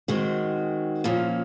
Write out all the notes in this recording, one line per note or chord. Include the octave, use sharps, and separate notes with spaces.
D#3 G#3 C4 F#4
A#2 F3 A#3 C#4